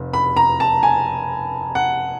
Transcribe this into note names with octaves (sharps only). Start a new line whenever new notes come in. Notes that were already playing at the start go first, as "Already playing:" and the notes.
Already playing: F1 F2
B5
A#5
A5
G#5
F#5